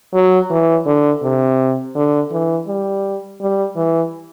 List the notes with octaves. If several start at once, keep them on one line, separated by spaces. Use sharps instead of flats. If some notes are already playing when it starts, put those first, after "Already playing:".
F#3
E3
D3
C3
D3
E3
G3
G3
E3